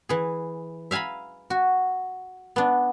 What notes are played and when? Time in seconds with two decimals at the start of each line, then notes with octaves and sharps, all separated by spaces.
0.09 E3 G#4
0.91 E5 F5 G#5 A#5 B5
1.50 F#4
2.56 B3 D4